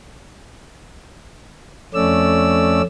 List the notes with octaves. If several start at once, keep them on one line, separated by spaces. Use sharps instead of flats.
F2 A3 C#4 D5 E6